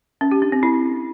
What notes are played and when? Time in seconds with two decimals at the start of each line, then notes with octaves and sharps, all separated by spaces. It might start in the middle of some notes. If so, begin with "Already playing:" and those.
0.21 C#4
0.31 G4
0.42 D4
0.52 C4
0.63 E4